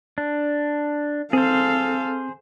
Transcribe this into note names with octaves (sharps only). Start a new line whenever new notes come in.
D4
C4 G#4 A4 C5 F5